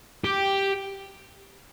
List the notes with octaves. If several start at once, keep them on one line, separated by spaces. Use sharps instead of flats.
G4